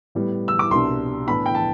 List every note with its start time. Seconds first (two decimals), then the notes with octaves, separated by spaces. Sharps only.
0.15 A2 G3 B3
0.48 E6
0.59 D6
0.71 C2 B2 G3 D4 C6
1.27 A2 E3 B3 D4 B5
1.46 G5
1.55 A5